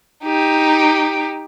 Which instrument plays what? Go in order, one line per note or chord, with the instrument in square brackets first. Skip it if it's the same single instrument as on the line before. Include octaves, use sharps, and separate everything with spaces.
[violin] D#4 G4